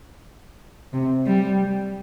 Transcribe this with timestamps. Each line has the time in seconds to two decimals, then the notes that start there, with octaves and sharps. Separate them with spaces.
0.93 C3
1.26 G3